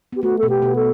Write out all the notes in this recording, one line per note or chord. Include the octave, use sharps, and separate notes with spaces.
B3 G4
A3 F#4
B2 B3 A4
G4
B2 B3
A4